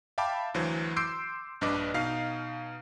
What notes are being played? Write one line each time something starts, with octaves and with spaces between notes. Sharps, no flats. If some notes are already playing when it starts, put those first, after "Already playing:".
E5 F5 G5 A5 B5 D6
D2 E3 F#3 C5
C6 D6 E6 G6 C7 D7
A#1 G2 D4 B4 D#5 D6
B2 D#4 F5 F6 C7